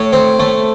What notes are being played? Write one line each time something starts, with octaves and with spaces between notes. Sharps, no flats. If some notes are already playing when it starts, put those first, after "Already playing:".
Already playing: A2 C#5
C4
A3